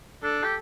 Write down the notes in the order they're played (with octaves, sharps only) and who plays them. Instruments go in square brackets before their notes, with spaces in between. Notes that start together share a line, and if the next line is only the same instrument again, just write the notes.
[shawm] D4 [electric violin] A4
[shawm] G4